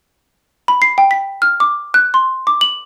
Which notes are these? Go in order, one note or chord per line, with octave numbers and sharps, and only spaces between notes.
B5
C7
G5
B6
F6
D6
F#6
C6
D6
F#7